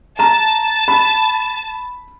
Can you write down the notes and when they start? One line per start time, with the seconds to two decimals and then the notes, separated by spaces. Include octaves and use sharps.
0.19 A5 A#5 E7
0.88 B5